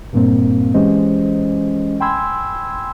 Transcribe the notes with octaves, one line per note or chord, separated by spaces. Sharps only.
G2 A#2 G3 A#3 C4
E3 G#3 C#4 G4 C5 D#5
G5 G#5 B5 C6 E6 G#6